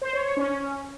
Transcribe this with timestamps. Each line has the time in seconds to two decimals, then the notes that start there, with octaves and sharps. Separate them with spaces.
0.02 C5
0.13 C#5
0.25 C#5
0.37 C#4
0.48 C#4